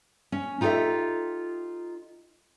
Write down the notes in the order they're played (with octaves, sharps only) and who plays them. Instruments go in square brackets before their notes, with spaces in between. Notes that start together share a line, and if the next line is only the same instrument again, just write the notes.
[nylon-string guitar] C#4
D#4 F4 G4 A4 D#5 E5